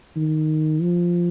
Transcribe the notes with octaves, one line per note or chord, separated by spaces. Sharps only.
D#3
F3